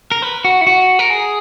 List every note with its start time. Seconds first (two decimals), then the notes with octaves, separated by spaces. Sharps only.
0.11 A#4
0.22 B4
0.45 F#4
0.61 E4
0.67 F#4
0.99 A#4
1.10 G#4